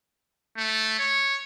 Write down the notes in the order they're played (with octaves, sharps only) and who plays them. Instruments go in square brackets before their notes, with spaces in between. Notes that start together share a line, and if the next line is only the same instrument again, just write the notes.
[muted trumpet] A3
C#5